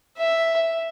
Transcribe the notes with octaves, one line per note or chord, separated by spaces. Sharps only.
E5